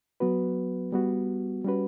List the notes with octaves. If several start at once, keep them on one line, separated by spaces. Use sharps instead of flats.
F#3 B3 F#4 B4
G3 B3 F#4
G3 C#4 F#4 B4